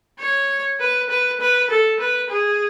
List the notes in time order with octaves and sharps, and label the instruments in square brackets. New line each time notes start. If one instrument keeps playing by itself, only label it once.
[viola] C#5
B4
B4
B4
A4
B4
G#4